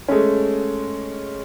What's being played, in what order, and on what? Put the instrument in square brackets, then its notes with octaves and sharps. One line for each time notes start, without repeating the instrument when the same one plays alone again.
[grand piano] G#3 A3 C#4